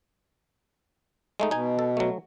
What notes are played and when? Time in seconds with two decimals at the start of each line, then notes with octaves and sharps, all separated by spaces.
1.40 G#3 A3 D#4
1.51 B2 D#4 G#5
1.79 A4
1.97 F#3 A3